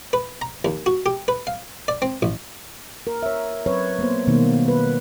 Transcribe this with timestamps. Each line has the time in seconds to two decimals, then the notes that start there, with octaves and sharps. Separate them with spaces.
0.13 B4
0.41 A#5
0.65 D#2
0.86 F#4
1.06 G4
1.28 B4
1.47 F5
1.88 D5
2.02 C4
2.22 A1
3.07 A#4
3.23 C#5 E5
3.66 F#3 C4 B4 C#5
3.99 A#3 B3 C5
4.27 B2 D#3 F#3 G3 A#3 B3
4.68 B4